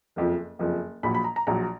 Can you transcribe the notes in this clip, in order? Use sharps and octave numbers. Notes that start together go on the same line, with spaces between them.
F#1 F2 F3
F#1 F2 F3
A#1 A#2 F#3 B5
B5
A#5
A#5
A#1 A#2 F#3 A#5